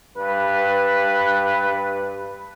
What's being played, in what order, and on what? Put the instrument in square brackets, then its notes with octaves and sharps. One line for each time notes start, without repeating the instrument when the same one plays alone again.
[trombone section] G2 B4